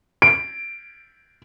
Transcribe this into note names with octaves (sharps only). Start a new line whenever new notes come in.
D7